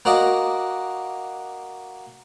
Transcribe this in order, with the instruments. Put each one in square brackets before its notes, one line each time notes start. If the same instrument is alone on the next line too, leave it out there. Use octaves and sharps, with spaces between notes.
[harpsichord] A#3 F#4 D5 D#5